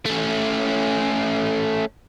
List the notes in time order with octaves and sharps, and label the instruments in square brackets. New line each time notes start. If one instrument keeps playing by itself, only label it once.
[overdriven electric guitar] A3 C#4